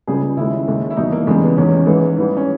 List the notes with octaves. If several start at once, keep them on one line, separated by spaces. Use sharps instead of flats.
C#2 C#3 G3 G#4
D#2 C#3 G#3 E4
D#2 D#3 G#3
E4
E2 B2 G3 D#4
A#3
E2 C#3 G3 G#3
B3
E2 D#3 G#3 C#4
G#2 E3 G#3
G#2 E3 G3
C#4